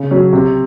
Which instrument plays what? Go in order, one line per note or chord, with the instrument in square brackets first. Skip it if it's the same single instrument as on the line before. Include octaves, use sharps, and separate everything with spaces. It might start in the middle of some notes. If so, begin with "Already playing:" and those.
Already playing: [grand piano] C#3
F#3 C#4
C3